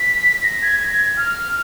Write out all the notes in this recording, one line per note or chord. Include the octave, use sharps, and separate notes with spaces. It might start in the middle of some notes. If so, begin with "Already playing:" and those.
Already playing: B6
A#6
G#6
G#6
F6